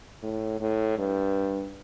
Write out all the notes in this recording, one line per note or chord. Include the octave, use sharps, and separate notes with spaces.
A2
A2
G2